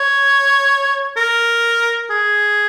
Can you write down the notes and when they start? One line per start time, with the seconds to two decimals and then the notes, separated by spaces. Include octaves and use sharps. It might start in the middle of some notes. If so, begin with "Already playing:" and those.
Already playing: C#5
1.17 A#4
2.10 G#4